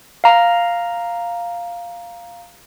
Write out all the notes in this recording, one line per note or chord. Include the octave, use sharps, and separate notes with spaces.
F5 A#5